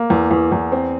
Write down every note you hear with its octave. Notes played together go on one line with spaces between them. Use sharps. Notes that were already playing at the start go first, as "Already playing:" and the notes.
Already playing: A#3
E2
E2
E2
C4